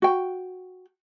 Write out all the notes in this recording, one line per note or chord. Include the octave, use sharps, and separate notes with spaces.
F#4 G5